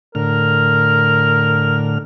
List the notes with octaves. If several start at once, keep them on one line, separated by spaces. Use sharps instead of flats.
A2 D3 A#4 F6